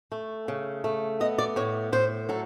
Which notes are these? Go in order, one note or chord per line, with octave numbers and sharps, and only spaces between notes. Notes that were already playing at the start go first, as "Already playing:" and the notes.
A3
C#3
A3
B3 D#5
D5
A2 C#5
A2 C5
F#3 A4